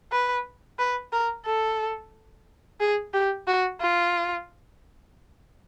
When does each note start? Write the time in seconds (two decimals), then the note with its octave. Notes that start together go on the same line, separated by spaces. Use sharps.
0.12 B4
0.79 B4
1.13 A#4
1.46 A4
2.80 G#4
3.13 G4
3.47 F#4
3.81 F4